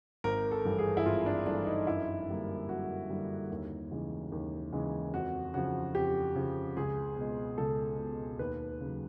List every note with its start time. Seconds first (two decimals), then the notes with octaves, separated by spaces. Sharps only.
0.24 G#1 A#4
0.51 A4
0.65 G2 E3 A3
0.78 G#4
0.97 E4
1.06 G#1 F4
1.26 D4
1.46 G2 E3 A3 D4
1.67 D#4
1.87 F#2 E4
2.28 D3 G3 A#3
2.69 F#2 F#4
3.09 D3 G3 A#3
3.50 D#2
3.91 C#3 E3 G#3
4.32 D#2
4.72 C#3 E3 G#3
5.14 F2 F#4
5.54 C#3 F3 F#4
5.95 F2 G4
6.35 C#3 F3
6.77 C#2 G#4
7.17 B2 G#3
7.58 C#2 A4
7.98 B2 G#3
8.39 D#2 B4
8.80 C#3 F#3